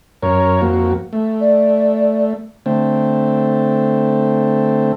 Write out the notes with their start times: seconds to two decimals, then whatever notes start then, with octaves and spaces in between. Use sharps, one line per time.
0.23 F#2 A#4 C#5
0.61 F2 A#3 F#4
1.13 A3
1.41 D5
2.66 D3 A3 C4